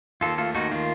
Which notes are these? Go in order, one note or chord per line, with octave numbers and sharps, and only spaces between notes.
D#2 F4 A4
A3 F4 A4
D#2 D#4 F#4
D#3 F4